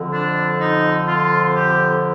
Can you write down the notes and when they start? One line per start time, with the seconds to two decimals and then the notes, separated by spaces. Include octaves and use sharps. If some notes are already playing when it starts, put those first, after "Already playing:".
Already playing: F2 D3 F3
0.12 D4
0.59 D#4
1.06 F4
1.53 G4